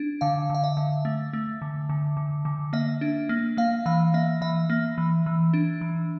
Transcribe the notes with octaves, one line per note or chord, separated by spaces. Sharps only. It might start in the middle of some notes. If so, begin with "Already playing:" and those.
Already playing: D4
D3 F5
D3 F5
E5
D3
A3
A3
D3
D3
D3
D3
A#3 E5
D4
A#3
A#3 F5
E3 F5
A#3 E5
E3 E5
A#3
E3
E3
D4
E3